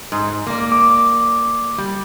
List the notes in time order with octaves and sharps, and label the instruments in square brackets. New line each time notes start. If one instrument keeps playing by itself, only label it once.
[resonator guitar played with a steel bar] G#2
A#3 D5
[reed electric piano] D6
[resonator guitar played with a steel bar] G3